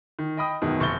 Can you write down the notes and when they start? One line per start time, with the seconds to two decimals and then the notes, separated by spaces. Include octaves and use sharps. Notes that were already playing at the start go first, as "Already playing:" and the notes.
0.19 D#3
0.37 D#5 G5 B5 D#6
0.62 E1 F#2 B2 D#3
0.80 F1 C#6 G6 A6 G7